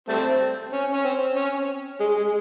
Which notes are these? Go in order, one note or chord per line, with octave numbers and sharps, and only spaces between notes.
G3 A3 C4
C#4
C#4
C4
C#4
G#3
G#3